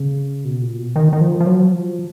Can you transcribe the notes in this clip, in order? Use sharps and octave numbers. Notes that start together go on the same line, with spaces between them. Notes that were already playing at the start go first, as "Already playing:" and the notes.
Already playing: C#3
B2
A#2
B2
D#3
D#3
F3
F3
F#3
F3